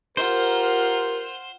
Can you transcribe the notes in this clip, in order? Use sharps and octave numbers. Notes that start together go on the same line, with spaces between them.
F4 G4 A#4 C5 F#5